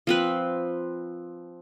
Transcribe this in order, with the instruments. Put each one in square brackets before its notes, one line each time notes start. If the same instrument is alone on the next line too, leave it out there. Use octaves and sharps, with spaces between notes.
[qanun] F3 C4 B4